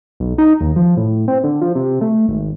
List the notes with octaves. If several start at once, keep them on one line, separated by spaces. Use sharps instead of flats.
B1
D#4
D#2
F3
A2
C4
D3
F3
C3
A3
G#1